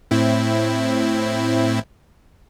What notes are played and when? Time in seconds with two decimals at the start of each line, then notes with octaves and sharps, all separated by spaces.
0.11 A2 C4 E4